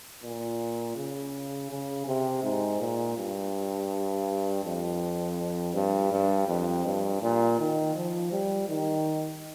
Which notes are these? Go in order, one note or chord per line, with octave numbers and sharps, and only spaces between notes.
A#2
C#3
C#3
C3
G#2
A#2
G2
F2
G2
G2
F2
G2
A#2
D#3
F3
G3
D#3